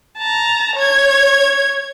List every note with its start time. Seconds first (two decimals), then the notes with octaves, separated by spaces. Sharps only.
0.17 A5 A#5
0.75 C#5 G#6